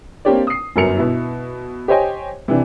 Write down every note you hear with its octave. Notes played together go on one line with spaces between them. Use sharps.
A#3 C4 D4 G4 C#5 D5
D#6 C7
G1 F#2 F#3 A#4 C#7 F7
B2 E4
G4 C5 C#5 D#5 G5 G#5
C3 E3 D4